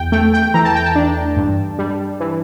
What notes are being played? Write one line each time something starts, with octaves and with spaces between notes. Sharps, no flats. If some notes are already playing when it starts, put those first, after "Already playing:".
Already playing: E2 G5
A3 G5
G5
E3 A#5
A5
G5
A5
D4
G2
G3
E3